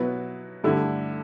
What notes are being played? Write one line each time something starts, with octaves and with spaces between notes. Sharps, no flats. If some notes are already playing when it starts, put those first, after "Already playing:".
Already playing: B2 F#3 B3 E4 B4
G2 D3 A3 E4